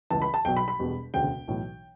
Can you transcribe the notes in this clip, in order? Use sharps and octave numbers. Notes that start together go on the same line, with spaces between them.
C#2 C#3 E3 A5
B5
A5
B1 B2 F#3 G5
B5
B5
E1 E2 B2 G3
E1 D2 C#3 G5
B1 A2 E3